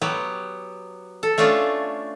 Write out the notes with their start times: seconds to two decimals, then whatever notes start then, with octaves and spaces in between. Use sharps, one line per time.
0.02 F#3 B3 G4
1.23 A4
1.38 A3 C#4 D4 F4